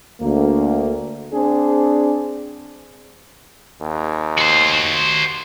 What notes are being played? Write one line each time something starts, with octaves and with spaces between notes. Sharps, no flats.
D2 A#3
C4 D4 G#4
D#2
F#4 C5